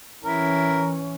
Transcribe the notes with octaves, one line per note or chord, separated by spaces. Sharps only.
E3 C#4 E4 A#4